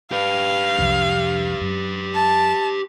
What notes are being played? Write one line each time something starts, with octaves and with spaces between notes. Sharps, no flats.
G4 B4 F5
C2 F2
F#2
A5